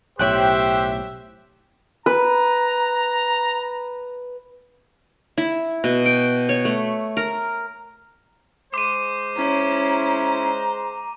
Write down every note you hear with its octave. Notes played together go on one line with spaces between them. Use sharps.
B1 A2 G4 C5 C#5 E5 G5 F#6
B4 A#5
E4
B2
G5
C#5
A3
A#4
G#3 C5 D6 D#7
C#4 E4 A#5